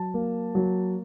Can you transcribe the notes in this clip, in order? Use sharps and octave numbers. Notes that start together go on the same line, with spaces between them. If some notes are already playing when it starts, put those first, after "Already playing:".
Already playing: F#3 A5
A#3
F#3